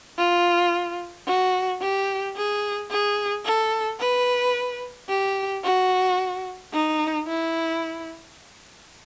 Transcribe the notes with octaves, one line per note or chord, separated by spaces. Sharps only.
F4
F#4
G4
G#4
G#4
A4
B4
G4
F#4
D#4
E4